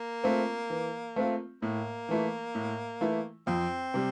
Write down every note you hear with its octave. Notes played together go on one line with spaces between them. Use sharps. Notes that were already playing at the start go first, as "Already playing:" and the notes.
Already playing: A#3
A3 C4 F4
E3
A3 C4 F4
A2 A#3
E3 A3 E4
A2
E3 A3 E4
F2 C4
C3 G3